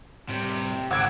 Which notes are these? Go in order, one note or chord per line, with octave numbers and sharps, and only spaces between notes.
A2 C3 G3
G#1 C#3 F#5 D6 E6 G#6